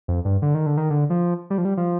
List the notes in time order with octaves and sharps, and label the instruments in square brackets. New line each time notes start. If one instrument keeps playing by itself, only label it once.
[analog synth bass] F2
G2
D3
D#3
D3
D#3
D3
F3
G3
F3
G3
F3